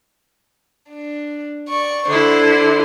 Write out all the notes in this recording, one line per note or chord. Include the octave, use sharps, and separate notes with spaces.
D4
D5 C#6
D3 E4 C5 C6